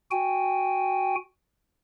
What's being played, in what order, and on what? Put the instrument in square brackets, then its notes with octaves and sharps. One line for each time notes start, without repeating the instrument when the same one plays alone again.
[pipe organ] F#4 G5 G#5